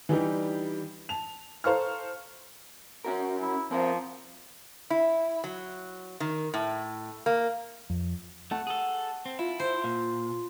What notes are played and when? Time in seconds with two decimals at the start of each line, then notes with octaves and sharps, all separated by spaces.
0.09 E3 G3 D4 D#4 G4
1.09 A5 F7
1.64 A4 C5 F5 A#5 C#6 F6
3.05 C#4 F#4 A#4
3.42 E4
3.71 F3 C4 A#4
4.90 E4
5.44 F#3
6.20 D#3
6.54 A2
7.26 A#3
7.90 F2
8.51 A3 F#5 A5 C#6
8.67 G#4 A4
9.26 C4
9.39 E4 F4
9.60 C5
9.84 A#2 F5